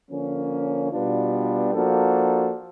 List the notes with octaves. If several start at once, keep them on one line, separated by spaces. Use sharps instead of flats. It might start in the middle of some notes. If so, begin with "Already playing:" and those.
D3 F3 A#3 C#4
B2 G3 B3 D4 F4
F3 A#3 D4 F#4 A4